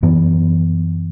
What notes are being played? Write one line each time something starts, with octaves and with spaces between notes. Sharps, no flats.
F#2 E3 B3